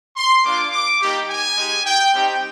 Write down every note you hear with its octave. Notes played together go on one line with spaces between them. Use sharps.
C6
A#3 D4 F4 D6
D6
G3 A#3 D#4 G4
G#5
G#3 D#4 G4
G5
G3 C4 D#4 G4 G5